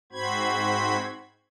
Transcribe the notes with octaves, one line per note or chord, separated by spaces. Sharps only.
G#2 C4 F#4 C5 B5 G#6